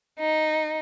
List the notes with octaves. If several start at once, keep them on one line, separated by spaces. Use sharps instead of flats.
D#4